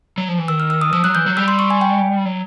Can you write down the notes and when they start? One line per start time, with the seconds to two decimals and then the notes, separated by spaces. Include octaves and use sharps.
0.18 F#3
0.28 F3
0.38 E3
0.48 D#3 E6
0.60 F6
0.70 E6
0.81 D#6
0.93 F3 E6
1.04 F#3 F#6
1.15 E3 G6
1.26 F#3
1.37 G3 E6
1.48 C6
1.59 C#6
1.70 G#5
1.81 G5
2.25 F#3